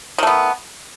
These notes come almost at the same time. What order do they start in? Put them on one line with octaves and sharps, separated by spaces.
D#3 A3 B3